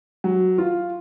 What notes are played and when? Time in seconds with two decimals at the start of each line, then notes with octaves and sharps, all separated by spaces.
0.24 F#3
0.58 F4